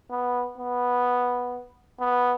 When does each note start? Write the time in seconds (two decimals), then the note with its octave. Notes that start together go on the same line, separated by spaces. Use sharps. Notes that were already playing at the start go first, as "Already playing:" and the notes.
0.11 B3
0.58 B3
2.00 B3